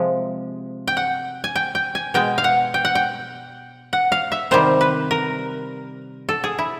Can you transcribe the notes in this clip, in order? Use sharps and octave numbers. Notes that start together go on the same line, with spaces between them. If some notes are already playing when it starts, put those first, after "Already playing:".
Already playing: C3 F3 G#3
G5
F#5
G#5
G5
G5
G#5
B2 G#3 G5
F5
F#5
G5
F#5
G5
F#5
F5
E5
C3 D#3 G3 C5
B4
A#4
A4
G#4
E4